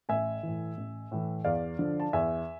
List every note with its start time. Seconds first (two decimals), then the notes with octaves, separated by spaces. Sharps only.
0.09 A1 E5 G#5
0.43 A2 E3
0.77 A1
1.11 A2 E3
1.44 E2 D5 F5
1.79 D3 F3
2.00 A5
2.13 E2 E5 G#5